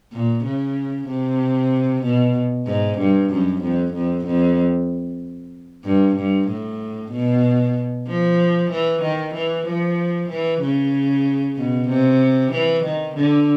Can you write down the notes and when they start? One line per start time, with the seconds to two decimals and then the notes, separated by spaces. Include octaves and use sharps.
0.12 A#2
0.44 C#3
1.08 C3
2.03 B2
2.67 G#2
2.98 G2
3.30 F#2
3.62 F2
3.94 F2
4.26 F2
5.84 G2
6.16 G2
6.48 A2
7.12 B2
8.07 F3
8.71 E3
9.02 D#3
9.34 E3
9.66 F3
10.29 E3
10.61 C#3
11.56 B2
11.89 C3
12.52 E3
12.84 D#3
13.16 D3